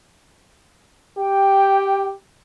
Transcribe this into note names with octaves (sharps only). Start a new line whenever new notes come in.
G4 G5